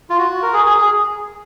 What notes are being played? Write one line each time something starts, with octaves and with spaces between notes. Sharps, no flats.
F4
F#4
A#4
G#4
G#4
G#4